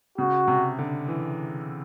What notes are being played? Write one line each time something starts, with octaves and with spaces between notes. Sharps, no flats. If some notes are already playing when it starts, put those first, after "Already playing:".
C#3 F#4
C3
D3
E3